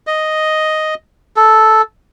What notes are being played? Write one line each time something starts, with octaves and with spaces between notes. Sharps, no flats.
D#5
A4